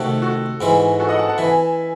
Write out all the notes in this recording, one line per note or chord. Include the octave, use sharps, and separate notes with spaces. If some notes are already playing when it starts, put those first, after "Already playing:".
Already playing: C3 D#3 A3 F#4 A4
F#4 A4
G#2 E3 G#3
F#4 A4
D#5 F#5
F#5 A5
F#5 A5
E3 E5 G#5